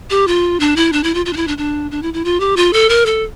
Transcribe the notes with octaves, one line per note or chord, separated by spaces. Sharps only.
G4
F4
D4
E4
D4
E4
F4
F4
D4
E4
D4
D4
D4
E4
E4
F4
G4
F4
A4
A#4
A4